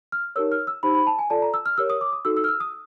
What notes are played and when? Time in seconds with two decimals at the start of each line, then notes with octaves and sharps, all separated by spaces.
0.12 F6
0.36 D#4 G4 A#4 C#5 E6
0.52 F6
0.67 E6
0.83 D#4 G4 C5 B5
0.95 B5
1.07 A5
1.19 G#5
1.30 F4 A4 D5 A5
1.42 A#5
1.54 E6
1.66 F6
1.78 G4 A#4 C#5 E6
1.90 D#6
2.01 D6
2.13 D#6
2.25 D#4 F#4 A4 E6
2.37 E6
2.44 F6
2.48 E6
2.60 D#6